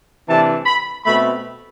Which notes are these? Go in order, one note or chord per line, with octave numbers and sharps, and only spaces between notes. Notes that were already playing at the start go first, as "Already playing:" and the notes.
C3 E3 A3 D4 A5
B5
B2 A3 C4 B5